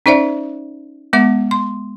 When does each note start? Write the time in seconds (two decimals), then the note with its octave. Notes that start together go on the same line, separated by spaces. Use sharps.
0.06 C#4 D#4 C5 D5 E5
1.13 G#3 B3 E5 D6
1.51 C6